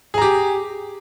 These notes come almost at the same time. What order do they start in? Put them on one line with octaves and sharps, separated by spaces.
G#4 A#5 G4